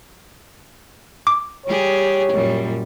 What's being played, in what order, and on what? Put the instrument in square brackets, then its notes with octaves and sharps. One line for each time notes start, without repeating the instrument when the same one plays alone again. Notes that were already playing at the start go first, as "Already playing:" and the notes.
[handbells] D6
[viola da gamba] G3 G4 G#4 [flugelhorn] C#5
[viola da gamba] F#2 A#2 G3